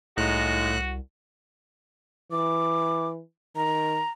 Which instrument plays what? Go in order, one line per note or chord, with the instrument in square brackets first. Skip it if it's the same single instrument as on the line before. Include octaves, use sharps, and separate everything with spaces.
[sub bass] C2 [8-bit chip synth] A2 F#6 [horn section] G#3 D#4 F4 [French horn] F#4
[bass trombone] E3 [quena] D6
[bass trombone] D#3 [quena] A#5